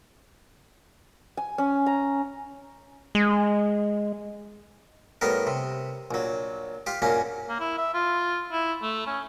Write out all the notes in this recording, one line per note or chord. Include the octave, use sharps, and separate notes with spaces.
G#5
C#4
A#5
G#3
A2 G3 B3 A#4
C3
A#1 F#3
F4 G4
A#1 F#2 A#3 C#4
A#3
E4
E5
F4
E4
A3
C#4